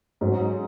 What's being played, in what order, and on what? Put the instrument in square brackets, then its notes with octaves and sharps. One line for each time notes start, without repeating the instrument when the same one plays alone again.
[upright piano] G#2 F#3 C#4